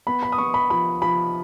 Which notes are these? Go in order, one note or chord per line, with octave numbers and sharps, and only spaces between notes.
B3 B5
B5
D#6
B3 C#6
B5
F3 B5
F3 B5